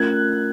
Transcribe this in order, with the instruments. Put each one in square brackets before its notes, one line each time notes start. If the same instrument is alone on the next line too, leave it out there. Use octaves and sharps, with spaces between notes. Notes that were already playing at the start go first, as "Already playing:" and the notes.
Already playing: [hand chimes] A3 C#4 F4 A#4 [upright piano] F#6 G#6